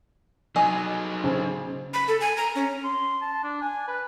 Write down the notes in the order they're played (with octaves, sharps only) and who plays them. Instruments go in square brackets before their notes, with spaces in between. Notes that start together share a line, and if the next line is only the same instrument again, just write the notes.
[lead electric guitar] F#3 D#4 [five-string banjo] G#4 D#5
[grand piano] C#3 C5 G#5
[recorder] B5
A4
G#5
A#5
C#4
[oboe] C6
A5
D4
G#5
B4